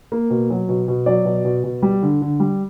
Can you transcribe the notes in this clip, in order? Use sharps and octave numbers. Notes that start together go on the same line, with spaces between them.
A#3
B2
F#3
B2
B2
F#3 D5
B2
B2
B2
G3
D3
D3
G3